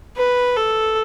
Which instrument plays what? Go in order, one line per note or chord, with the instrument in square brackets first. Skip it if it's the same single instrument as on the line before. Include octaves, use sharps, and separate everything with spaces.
[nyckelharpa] B4
A4